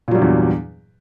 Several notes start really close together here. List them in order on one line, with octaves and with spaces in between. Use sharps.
A#2 F#3 G3 G2 E2